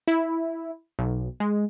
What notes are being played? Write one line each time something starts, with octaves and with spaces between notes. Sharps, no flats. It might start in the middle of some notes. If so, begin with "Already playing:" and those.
E4
B1
G#3